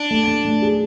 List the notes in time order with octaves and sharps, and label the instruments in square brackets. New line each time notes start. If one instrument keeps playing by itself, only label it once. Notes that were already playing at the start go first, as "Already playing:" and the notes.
Already playing: [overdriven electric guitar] D4
[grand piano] A3
A3
A3
G#4